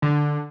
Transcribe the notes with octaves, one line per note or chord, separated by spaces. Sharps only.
D3